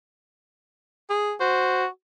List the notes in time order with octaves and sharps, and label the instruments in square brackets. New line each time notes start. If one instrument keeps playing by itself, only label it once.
[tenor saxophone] G#4
[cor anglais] F#4 [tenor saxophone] C5